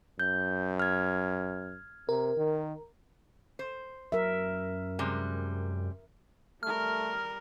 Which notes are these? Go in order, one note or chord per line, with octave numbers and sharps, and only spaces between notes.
F#2 G6
F6 G#6
C3 A#4
D#3
C5
F#2 A#4 E5
C3 G3 G#3
G3 A3 A#4 F6